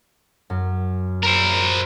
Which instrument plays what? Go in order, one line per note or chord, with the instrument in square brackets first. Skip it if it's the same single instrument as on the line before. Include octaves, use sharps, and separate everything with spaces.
[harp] F#2
[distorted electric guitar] A#4 C5